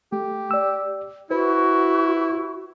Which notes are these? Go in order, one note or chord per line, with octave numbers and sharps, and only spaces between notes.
A3 G4
D5 E6
E4 F#4 B4 C5